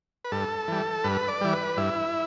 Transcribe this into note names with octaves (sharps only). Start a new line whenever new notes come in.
B4
G2 A4
E3 G3
G2 B4
D5
E3 G3
B4
G2 E4